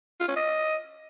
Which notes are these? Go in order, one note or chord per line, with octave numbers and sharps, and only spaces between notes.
F4
C#4
D#5